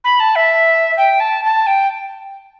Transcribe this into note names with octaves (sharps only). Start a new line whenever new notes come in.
B5
A5
E5
G5
A5
A5
G5